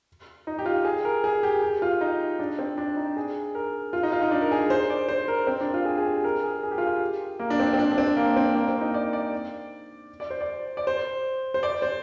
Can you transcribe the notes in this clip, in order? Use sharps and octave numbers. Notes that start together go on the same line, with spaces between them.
D#4
G4
F4
G#4
A#4
G#4
G4
G4
F4
D#4
D4
C4
D4
D#4
G#4
A#4
F4
D#4
F4
D#4
D4
A#4
G#4
C5
D5
C5
A#4
C4
D4
F4
G#4
G#4
G4
A#4
G#4
G#4
G4
F4
G4
A#3
D4
C4
C4
D4
D4
C4
A#3
C4
A#3
C4
D#4
D5
D5
D5
C5
D5
D5
C5
C5
D5
C5